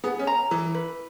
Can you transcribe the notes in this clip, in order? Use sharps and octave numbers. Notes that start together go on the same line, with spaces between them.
B3 G#4
C#4
A#5
E3 E4
B4